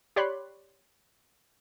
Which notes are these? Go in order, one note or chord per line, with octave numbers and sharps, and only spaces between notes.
G4 C#5 D5 B5 C6 F#6